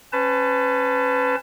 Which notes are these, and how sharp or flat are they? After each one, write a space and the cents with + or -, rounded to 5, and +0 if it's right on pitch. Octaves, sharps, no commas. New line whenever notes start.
C#4 -20 B4 +25 A5 +0